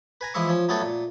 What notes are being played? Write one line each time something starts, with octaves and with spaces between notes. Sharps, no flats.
B4 G#5 A#5
E3 F3 G#3 E4 E5 C#6
F3 C#4
F#3 A3 B3 C#4 A4
A#2